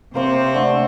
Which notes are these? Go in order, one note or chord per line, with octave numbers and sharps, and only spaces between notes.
C3 A#3 C4 C5 C#5
D3 A3